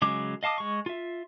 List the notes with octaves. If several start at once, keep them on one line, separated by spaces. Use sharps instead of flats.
C#3 F#3 G#3 D6
D#5 F5 A5 D6 D#6
G#3 C#6
F4 E5